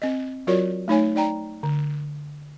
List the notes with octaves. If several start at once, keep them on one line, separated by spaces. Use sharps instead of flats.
C4 D#5
F#3 F4 F#4 A#4 C#5 D5
A3 D#4 C#5 G#5
D#4 D5 G5 A#5
D3